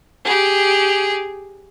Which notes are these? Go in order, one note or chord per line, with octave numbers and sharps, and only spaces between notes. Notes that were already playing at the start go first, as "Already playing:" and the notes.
G4 G#4